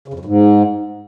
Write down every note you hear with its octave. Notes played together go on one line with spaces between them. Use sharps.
C#3
F2
F#2
G#2